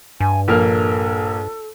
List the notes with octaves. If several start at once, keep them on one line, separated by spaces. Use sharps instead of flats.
G2 G#5
A#1 A#3 A4 F6